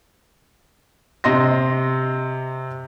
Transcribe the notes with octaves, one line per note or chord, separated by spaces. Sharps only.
C3 D#5 C6 A#6